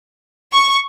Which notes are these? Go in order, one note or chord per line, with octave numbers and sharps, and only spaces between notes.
C#6